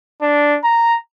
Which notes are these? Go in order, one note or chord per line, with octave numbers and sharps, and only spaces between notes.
D4
A#5